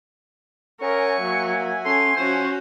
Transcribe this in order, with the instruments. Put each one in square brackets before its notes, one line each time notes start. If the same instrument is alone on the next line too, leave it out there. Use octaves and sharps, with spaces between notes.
[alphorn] C#4 [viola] A#4 [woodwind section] E5 F#5 G#5 [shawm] C#6
[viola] F#3 [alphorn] A#3
[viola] C#4 [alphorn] A4 [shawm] C6
[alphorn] F3 [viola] C#4 F#4 [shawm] C5